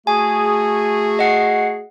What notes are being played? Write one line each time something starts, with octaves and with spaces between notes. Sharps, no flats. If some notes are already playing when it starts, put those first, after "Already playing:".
A3 F#4 G#4 G#5
D#5 F#5 C7